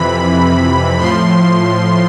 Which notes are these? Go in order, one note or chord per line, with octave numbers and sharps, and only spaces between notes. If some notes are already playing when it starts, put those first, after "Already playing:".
Already playing: F2 C3 E3 B5
A2 F3 C6